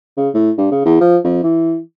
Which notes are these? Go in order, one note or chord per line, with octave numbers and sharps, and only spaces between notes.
C#3
A2
G2
C#3
E2
F3
F2
E3